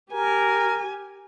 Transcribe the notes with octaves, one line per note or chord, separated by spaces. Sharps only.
G4 A#4 G#5